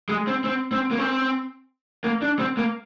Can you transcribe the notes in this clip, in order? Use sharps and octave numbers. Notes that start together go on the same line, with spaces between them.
G#3
C4
C4
C4
A#3
C4
A#3
D4
C4
A#3